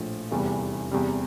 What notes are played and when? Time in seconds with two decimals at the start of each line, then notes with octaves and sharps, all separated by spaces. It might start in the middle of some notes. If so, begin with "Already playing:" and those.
Already playing: A#1 A2 F3
0.31 F1 E2 E3 G3
0.91 E2 C3 G3